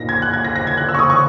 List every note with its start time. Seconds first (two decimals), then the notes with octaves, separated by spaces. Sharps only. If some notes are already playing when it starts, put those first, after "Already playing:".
Already playing: A#2 A#3 D#4 A#6
0.09 G#6
0.22 F#6
0.33 G#6
0.44 A#6
0.56 A#6
0.67 G#6
0.77 F#6
0.89 E6
0.94 C#6
0.99 D#6
1.10 C#6